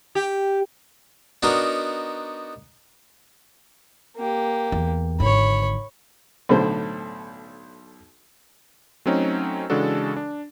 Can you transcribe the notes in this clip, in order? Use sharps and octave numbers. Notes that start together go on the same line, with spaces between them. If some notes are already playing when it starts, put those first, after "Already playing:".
G4
B3 D4 D#4 F#4 A#4
A#3 G4
E2
G#1 D3 C#5 B5
B1 A2 D3 C5
F#3 A3 C4 C#4 D#4
C#3 E3 G#3 D4 F#4 A4
D4